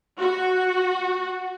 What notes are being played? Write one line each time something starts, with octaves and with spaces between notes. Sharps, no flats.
F#4